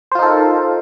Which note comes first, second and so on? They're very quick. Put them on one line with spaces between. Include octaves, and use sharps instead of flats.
C5 F4 D#4 A4 A#4